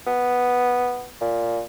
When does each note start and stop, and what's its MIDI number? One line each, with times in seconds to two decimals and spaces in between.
0.07 1.07 59
1.21 1.62 46